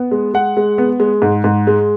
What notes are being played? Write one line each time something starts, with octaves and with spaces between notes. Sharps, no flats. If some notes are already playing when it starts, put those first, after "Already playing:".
Already playing: B3
G#3
G#3 F#5
G#3
B3
G#3
G#2
G#2
G#3